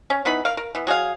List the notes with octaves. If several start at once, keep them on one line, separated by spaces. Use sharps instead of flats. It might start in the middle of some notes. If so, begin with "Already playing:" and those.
C#4
E3 B3 D#4 B5
A#4 F5
A#4
E3 B3
F#3 G#4 A4 F5